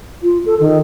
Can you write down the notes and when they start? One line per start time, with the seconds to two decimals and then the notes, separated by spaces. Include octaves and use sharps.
0.23 F4
0.46 A4
0.60 D#3